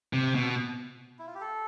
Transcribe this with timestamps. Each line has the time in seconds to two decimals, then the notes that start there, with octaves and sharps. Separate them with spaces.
0.13 C3
0.35 B2
1.19 E4
1.27 F4
1.35 G4
1.41 A4